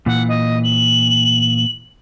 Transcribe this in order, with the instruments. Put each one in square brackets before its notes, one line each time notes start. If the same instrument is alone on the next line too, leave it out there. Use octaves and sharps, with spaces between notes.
[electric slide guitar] A#2 E3 [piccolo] F#5
[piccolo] D#5
F#7